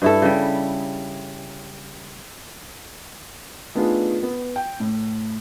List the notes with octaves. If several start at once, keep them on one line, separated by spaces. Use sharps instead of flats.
G2 E4 A4
C#3 G3
A3 B3 D4 D#4 F4 G#4
B3
G5
A2